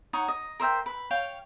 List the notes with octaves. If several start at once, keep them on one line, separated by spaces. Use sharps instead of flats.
D#4 C#5 F#5
D#5
A#4 C5 E5 G5
B4
C#5 F5 G5